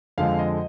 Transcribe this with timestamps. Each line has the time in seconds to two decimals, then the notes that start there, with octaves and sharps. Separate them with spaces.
0.18 F2 D3 G#3 F5
0.39 D#5